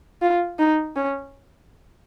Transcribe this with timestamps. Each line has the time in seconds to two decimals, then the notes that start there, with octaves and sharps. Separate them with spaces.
0.22 F4
0.59 D#4
0.96 C#4